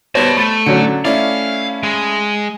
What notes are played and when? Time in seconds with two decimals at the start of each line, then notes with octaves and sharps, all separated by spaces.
0.15 G3 B3 C5 C#5 D#5 A5
0.37 A3 B5 A6
0.66 D3 F#3 C#4 C#7
1.05 A3 C#4 E4 D5 F5
1.83 G#3